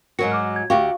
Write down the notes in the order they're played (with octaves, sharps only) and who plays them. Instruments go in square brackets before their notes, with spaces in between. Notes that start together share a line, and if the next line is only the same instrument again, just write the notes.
[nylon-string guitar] G#2 F#3 F#4 [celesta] A#4 C#7
[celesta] D6 F6
G#6
[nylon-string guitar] D2 F#4 G4 [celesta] F5 C#6